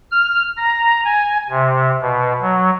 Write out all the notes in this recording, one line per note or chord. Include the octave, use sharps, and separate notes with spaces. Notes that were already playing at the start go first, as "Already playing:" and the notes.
F6
A#5
G#5
C3
B2
F#3